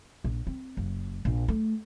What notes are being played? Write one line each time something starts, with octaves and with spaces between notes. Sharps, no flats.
A#1
C4
F#1
A#1
A3